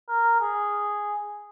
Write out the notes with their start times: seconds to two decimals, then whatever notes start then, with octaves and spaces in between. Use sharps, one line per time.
0.09 A#4
0.41 G#4